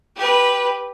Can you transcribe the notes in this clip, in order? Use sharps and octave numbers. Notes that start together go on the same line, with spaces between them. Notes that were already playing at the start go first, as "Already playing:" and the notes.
G4 B4